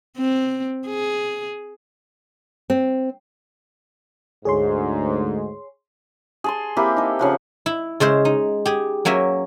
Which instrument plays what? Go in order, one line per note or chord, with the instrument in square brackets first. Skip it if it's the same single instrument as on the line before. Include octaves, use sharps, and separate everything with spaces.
[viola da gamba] C4
G#4
[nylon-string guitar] C4
[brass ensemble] D2 G#2 [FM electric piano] G#4 C#5 C6
[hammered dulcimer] G#4 A5 C6
A#3 C4 E4 G4
D#4 A4
C#3 F3 F#5
[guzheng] E4
C#3 G#3 C5 E5
D#4
G4 G#4
F#3 A#3 C#4 E5